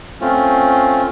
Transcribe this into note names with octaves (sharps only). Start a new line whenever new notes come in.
A3 C4 C#4 F4